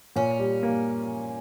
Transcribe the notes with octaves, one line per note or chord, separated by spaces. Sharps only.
A#2 C#4
G3
A#3